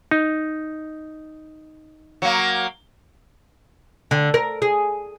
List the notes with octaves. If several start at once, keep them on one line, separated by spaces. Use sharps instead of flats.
D#4
F#3 A#3
D3
A#4
G#4